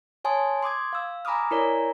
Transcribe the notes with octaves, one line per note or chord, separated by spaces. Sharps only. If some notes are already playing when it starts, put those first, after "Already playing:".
C#5 G#5 A5 C6 D#6
C6 D6 D#6 G#6
F5 E6
G#5 A#5 B5 D6 D#6 F6
E4 A#4 C#5 D5 G#5 A#5